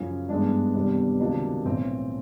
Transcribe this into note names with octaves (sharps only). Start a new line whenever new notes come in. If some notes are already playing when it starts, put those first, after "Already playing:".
Already playing: F#2 C#3 F3 C#4
G2 E3 G#3 B3 D4
E2 C3 D#3 G3 B3
C#2 C3 D#3 F#3 A#3 D4
B1 A2 E3 C4